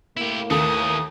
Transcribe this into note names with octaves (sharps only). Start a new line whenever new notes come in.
A2 A#3 E4 G4
D#2 E3 A3 A4 D#6